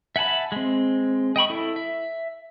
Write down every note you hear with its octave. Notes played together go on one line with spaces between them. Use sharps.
E5 F#5 G#5 A5 B5
G#3 C4
D#5 G5 B5 C#6
E4 A4
E5